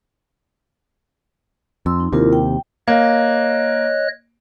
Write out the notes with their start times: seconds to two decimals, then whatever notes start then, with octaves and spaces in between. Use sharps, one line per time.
1.86 F2 C6 E6
2.00 D#4
2.12 D#2 C3 E4 F4 A#4
2.33 G5
2.88 A#3 C#5 D#5 F#6